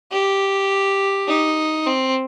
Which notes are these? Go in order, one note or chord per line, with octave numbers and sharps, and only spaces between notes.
G4
D#4
C4